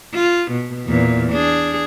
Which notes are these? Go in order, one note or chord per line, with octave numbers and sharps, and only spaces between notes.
F4
B2
E2 A#2
D4 G#4